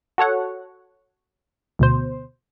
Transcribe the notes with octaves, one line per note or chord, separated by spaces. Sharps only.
F#4 A4 C#5 F#5
D2 B2 C5